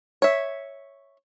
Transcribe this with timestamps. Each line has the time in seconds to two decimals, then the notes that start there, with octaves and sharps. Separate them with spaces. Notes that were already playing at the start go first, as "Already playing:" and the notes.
0.22 C#5 E5